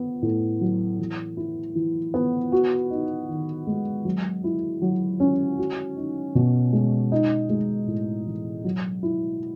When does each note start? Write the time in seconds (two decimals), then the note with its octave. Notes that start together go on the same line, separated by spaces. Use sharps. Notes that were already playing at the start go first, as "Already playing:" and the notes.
Already playing: B3
0.22 A2
0.61 F#3
0.99 E3
1.37 E4
1.75 E3
2.14 B3
2.52 F#4
2.91 D#4
3.29 D#3
3.67 G#3
4.05 F#3
4.44 E4
4.82 F#3
5.20 C#4
5.58 F#4
5.97 D#4
6.35 B2
6.73 G#3
7.12 D#4
7.50 G#3
7.87 A2
8.27 E3
8.64 F#3
9.03 E4